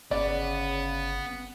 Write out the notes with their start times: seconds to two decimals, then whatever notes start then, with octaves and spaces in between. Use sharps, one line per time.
0.11 G1 C#3 B3 D5